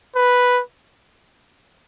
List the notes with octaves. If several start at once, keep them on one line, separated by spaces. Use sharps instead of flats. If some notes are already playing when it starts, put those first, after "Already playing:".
B4